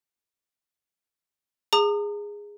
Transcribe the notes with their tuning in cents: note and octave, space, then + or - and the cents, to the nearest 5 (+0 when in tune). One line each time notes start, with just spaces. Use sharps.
G#4 -10 A#5 -35 D#6 -45